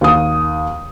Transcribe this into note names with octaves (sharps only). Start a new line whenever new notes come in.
D#2 D#6